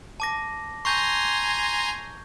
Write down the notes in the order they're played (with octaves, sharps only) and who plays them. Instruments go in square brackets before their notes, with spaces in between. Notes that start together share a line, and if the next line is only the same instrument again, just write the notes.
[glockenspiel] A5 D6 A#6
[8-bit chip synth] G#5 A#5 C6 [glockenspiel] C#6 G6 G#6